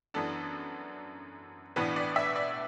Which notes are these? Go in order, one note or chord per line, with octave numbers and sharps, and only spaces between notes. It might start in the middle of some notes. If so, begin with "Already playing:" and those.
F#2 E3 B3 D4 A4
B1 A2 E3 B3 D4 B4
D5
E5
D5